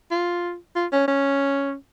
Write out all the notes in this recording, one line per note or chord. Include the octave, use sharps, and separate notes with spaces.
F4
F4
C#4
C#4